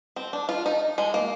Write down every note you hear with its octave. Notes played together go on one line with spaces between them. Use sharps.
C4
D4
F4
D#4
G#3
A#3